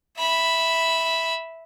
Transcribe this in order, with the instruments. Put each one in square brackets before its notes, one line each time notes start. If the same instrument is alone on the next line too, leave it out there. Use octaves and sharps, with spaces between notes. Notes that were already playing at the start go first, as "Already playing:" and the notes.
[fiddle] E5 B5